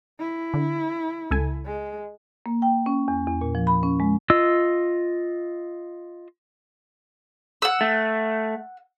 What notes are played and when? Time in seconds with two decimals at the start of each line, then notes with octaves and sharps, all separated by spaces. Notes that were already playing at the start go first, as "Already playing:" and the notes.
0.20 E4
0.54 D3
1.31 C#2 A4 G#5
1.66 G#3
2.46 A#3
2.62 G5
2.86 C#4
3.08 E2
3.28 E2
3.41 A#2
3.55 F3
3.67 B5
3.83 C#4
4.00 G#3
4.30 F4 D#5 E6
7.62 F#5 E6
7.81 A3